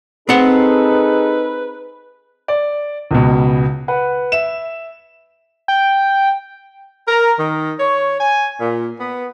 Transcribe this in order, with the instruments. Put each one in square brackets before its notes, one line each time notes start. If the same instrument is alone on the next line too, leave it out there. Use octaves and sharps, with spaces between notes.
[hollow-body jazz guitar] C4 F#5 [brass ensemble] D#4 A4 [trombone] G#4 [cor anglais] B4
[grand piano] D5
C#2 B2
B4 F#5
E5 E7
[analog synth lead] G5
[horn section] A#4
D#3
C#5
G#5
A#2
B3